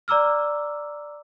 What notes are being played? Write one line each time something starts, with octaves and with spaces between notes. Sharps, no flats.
D5 A#5 D6 E6 F6